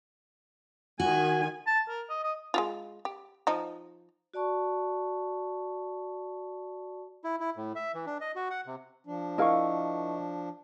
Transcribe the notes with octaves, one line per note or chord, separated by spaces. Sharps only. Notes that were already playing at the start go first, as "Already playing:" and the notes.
D#3 F#4 G#5
A5
A#4
D#5
D#5
G#3 E4 F4
G4
F3 D#4
F#4 D5 A5 C#6
E4
E4
A2
E5
E3
D4
D#5
F#4
F#5
C3
F3 D4
E4 A#4 D#5 F5 C#6